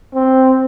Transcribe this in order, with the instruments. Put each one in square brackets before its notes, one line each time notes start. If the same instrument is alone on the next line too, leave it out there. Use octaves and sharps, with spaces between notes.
[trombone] C4